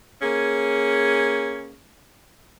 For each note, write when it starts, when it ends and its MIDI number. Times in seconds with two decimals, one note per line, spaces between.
0.22 1.75 58
0.22 1.75 61
0.22 1.75 68